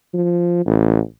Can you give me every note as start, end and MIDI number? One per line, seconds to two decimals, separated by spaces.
0.14 0.66 53
0.66 1.00 33